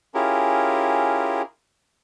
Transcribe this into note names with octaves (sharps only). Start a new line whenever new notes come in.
C#4 E4 F4 G4 G#4 A#4